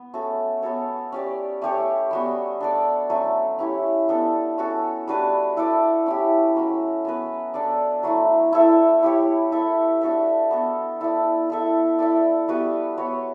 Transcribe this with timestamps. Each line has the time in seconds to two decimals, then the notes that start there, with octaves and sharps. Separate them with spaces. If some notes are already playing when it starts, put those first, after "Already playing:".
Already playing: B3
0.14 A3 C#4 F#4 A4
0.62 B3 F#4 A4 C#5
1.12 C#4 G4 D5
1.62 A3 C#4 G4 C#5
2.11 G3 B3 F#4
2.60 D4 A4 D5
3.10 F#3 A3 C#4
3.59 C#4 E4 G4 C#5
4.09 B3 D4 A4
4.58 C#4 F#4 A4
5.07 G3 D4 F#4 B4
5.57 E4 A4 D5
6.06 C#4 E4 G4
6.56 F#3 C#4 F#4
7.05 B3 F#4 B4
7.54 D4 A4 D5
8.03 F#3 A3 E4
8.53 E4 A4 E5
9.03 E4 G4 C#5
9.52 E4 A4 E5
10.01 D4 F#4 A4 E5
10.51 B3 F#4 A4
11.01 E4 A4 D5
11.50 E4 A4 E5
11.99 E4 A4 D5
12.48 G3 B3 F#4 B4
12.97 B3 F#4 C#5